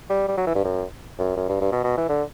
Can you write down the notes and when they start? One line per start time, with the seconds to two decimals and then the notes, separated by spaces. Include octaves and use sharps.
0.10 G3
0.28 G3
0.37 F#3
0.47 E3
0.55 G2
0.64 F#2
1.19 F#2
1.36 F#2
1.49 G2
1.61 G2
1.72 B2
1.84 B2
1.97 E3
2.09 D3